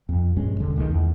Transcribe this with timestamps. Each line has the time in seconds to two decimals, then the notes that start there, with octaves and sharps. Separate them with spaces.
0.09 F2
0.36 A#1 G2 G#3 C#4
0.60 E1 D3
0.76 C#2 D#3 G#3
0.89 E2